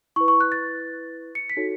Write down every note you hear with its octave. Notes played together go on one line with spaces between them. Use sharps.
E4 B4 C#6
C#6
F#6
A6
C#7
B6
D#4 F#4 A4 C#5